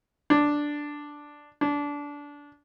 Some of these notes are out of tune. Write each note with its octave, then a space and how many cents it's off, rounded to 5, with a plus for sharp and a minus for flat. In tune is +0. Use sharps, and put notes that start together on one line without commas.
D4 +0
D4 -20